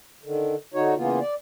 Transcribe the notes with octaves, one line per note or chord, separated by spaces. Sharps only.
D3 D#3
D3 D#4 F#4 C#5
C#3 E3 A#3 B3 F4
D5